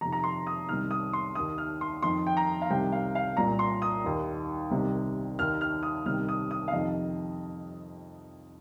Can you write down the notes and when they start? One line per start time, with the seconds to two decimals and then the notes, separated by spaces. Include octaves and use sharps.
0.01 F2 C3 D#3 A#5
0.12 A#5
0.24 C6
0.47 D#6
0.68 C2 C3 D#3 F6
0.91 D#6
1.13 C6
1.35 D#2 D#3 D#6
1.58 F6
1.81 C6
2.02 F2 D#3 C6
2.27 G5
2.37 A#5
2.62 F5
2.70 C2 C3 D#3 G5
2.92 F5
3.15 F5
3.37 C2 A#2 A#5
3.59 C6
3.82 D#6
4.04 D#2 D#3
4.71 C2 C3 D#3
5.39 D#2 D#3 F6
5.61 F6
5.83 D#6
6.06 C2 C3 D#3 F6
6.29 D#6
6.51 D#6
6.68 F5
6.73 F2 C3 D#3 D#5